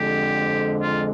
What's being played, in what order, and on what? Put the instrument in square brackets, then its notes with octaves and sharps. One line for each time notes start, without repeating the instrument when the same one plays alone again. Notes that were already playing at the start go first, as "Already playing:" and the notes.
Already playing: [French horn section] F2 D3 G#3 [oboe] G4
[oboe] F4